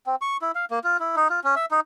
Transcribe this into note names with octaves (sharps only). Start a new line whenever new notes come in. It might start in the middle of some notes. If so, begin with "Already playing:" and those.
C4
C#6
E4
F5
A#3
F4
E4
D#4
F4
C#4
E5
D#4